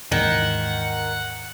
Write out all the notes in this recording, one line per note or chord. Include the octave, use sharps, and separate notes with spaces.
D#2 G#2 D#3 E3 F#5